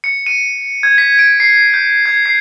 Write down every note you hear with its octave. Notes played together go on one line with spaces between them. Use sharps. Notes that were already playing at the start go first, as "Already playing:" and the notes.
C#7
D#7
G#6
B6
D7
C7
G6
G#6
C7